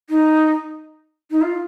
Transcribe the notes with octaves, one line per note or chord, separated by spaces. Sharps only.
D#4
D#4
F4